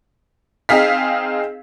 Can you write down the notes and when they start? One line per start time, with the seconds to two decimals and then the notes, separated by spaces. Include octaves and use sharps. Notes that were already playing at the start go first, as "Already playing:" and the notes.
0.69 C4 D#4 G#4 F5 B6